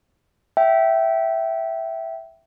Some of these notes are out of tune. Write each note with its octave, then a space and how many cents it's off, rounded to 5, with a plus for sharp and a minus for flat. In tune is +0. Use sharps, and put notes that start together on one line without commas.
E5 +0 G5 -20